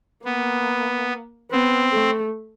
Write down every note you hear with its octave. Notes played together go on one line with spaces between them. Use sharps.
A#3 B3
B3 C4
A3